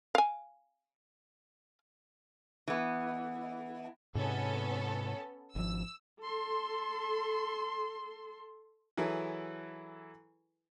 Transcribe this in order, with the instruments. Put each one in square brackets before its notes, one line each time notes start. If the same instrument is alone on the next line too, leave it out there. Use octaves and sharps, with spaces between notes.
[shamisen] F5 G#5
[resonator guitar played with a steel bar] E3 B3
[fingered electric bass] G#2 C3 [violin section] B3 C#4 A4
[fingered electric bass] G#1 F3 [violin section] E6
[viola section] A4 C6
[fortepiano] E3 F#3 E4 G#4 A4 B4